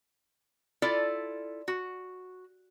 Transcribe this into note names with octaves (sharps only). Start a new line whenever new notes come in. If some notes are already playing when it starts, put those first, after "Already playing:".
E4 F4 A4 D5
F#4